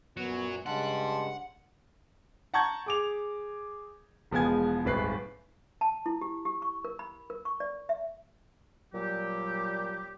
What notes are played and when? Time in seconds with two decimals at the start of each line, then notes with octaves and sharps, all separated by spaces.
0.17 F#2 A#2 F#3 B3
0.66 G2 C#3 G3 G#3 F#5 A5 C6
2.54 F#5 A5 A#5 C#6 G6 G#6
2.86 G#4 D6 F7
4.31 E1 F3 G#3 B3 G#5 G#6
4.85 D#1 G#1 B4 C7
5.81 A5
6.06 E4
6.21 G4
6.45 G4
6.62 C#6
6.85 A#4
6.99 B5
7.30 A#4
7.45 C#6
7.60 D5
7.89 E5
8.93 A#2 F#3 G3 G4